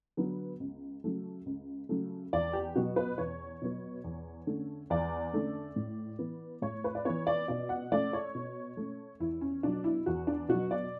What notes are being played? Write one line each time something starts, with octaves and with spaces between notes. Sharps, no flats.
D3 F#3 B3
C#2
C#3 F#3 A3
C#2
C#3 F#3 A3
E2 D5
G4
B2 F#3 B3 F#4
B4
E2 C#5
B2 F#3 B3
E2
D3 A3 C#4
E2 D5
D3 A3 C#4
A2
E3 B3
A2 C#5
B4
D5
E3 B3 C#5
D5
B2 D5
F#5
A3 C#4 D5
C#5
B2
A3 C#4
E2 E4
C#4
B2 F#3 D4
E4
E2 F#4
D4
B2 F#3 F#4
D5